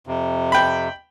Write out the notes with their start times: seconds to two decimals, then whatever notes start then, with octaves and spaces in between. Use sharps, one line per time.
0.07 F2 C3
0.52 G5 B5